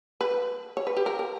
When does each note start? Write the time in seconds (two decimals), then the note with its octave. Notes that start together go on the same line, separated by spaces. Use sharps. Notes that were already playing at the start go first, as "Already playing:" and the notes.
0.21 B4
0.77 C#5
0.87 B4
0.97 G4
1.06 A#4
1.19 A#4